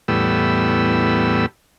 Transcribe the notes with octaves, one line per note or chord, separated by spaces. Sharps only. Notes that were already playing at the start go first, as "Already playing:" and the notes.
E2 A2 G3 B3 E6